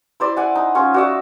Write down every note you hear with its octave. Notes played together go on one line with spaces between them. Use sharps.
E4 C5 D5
F#5 G#5
D#4
C#4 F4 C#5
F#4 D5 E5